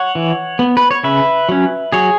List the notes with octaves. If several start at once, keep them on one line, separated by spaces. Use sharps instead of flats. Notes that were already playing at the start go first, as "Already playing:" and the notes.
Already playing: C#5 F#5
E3
B3
B4
C#5
C#3 B4 E5
F#3 C#4
F#3 G#4 C#5